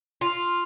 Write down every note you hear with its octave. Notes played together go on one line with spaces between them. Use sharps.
F4